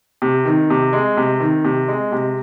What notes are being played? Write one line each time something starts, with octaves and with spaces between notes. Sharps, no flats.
C3
D#3
C3
G#3
C3
D#3
C3
G#3
C3